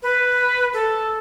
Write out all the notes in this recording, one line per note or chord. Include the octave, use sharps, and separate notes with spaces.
B4
A4